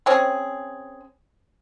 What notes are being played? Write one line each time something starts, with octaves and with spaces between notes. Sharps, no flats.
C4 C#4 G#4